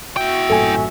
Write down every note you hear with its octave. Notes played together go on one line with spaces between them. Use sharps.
E4 F#4 E5 G5
A1 G2 A#2 A4 G#5